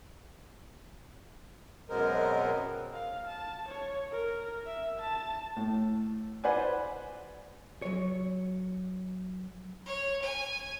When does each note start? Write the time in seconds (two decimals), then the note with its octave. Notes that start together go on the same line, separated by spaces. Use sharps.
1.89 F#2 B2 G#3 C4 A#4
2.94 F5
3.28 A5
3.69 C#5
4.12 A#4
4.67 E5
5.00 A5
5.56 A2
6.44 B4 C5 D5 F#5 G#5
7.82 F#3 C#5
9.86 C#5
10.22 G#5